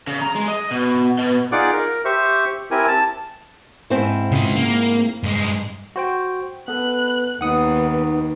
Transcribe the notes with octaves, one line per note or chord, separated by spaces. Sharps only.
C#3
A#5
G#3
D#5
B2
B2
D#4 F4 G#4 D5 F#5 D6
A#4
G4 C5 E5 C#6
C4 E4 G4 A#4 G#5
A5
G#2 C4 E4
C#3 F4
A#3
G2 G#3
F#4 C5 G5
B3 A4 B4 F#6
D#2 B3 D#4 F#5 D#6 C#7